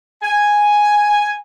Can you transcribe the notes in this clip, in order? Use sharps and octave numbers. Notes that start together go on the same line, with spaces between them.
G#5